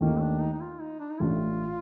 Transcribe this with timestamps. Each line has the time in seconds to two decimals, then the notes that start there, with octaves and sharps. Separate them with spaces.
0.01 D#2 D#3 A3 A#3
0.21 D4
0.41 D#4
0.53 D#4
0.60 F4
0.80 D#4
1.00 D4
1.11 D#4
1.20 A1 A2 A3 D4 F4